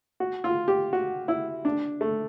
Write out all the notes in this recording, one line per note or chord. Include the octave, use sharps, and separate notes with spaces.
F#4
F4
G4
F#4
E4
D4
A3